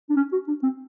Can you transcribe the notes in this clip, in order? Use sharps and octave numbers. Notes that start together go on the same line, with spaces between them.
D4
C#4
F#4
D4
C4